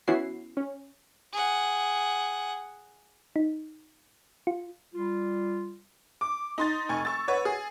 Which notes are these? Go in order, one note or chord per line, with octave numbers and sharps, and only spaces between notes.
E3 B3 C#4 E4 F#4 C7
C#4
G#4 F#5
D#4
F4
G3 F4
D6
D#4 C6 A6
F1 G#5 C#6
C#6 E6 A6
B4 C#5 F#5
G#4